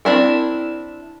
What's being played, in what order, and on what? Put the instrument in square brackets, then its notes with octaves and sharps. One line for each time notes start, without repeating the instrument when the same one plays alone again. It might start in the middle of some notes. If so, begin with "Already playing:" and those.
[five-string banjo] C4 D4 E4 A#4